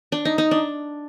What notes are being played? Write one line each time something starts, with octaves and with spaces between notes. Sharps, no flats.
D4
D#4
D#4
D4